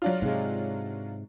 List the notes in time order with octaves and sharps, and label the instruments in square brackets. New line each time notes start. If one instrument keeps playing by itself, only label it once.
[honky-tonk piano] F#3 D4 F4
[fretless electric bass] G#2 C3 G#3